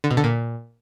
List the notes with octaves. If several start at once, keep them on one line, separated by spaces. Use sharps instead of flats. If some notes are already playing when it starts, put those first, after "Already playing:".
D3
B2
D3
A#2